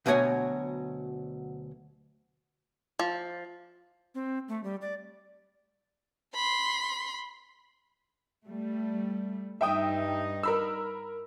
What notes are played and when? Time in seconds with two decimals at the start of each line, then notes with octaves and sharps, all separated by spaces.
0.06 D2 B2 F#3 C#5 F#5 G#5
2.99 F3
4.15 C4
4.49 A3
4.64 G3
4.82 D5
6.35 B5 C6
8.46 G3 A3
9.61 G2 D#4 E5 G5 D#6
10.43 A#4 B5 E6